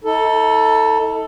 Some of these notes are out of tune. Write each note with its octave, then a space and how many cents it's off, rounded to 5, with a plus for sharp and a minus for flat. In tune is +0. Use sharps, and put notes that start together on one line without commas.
D#4 +45 A4 +10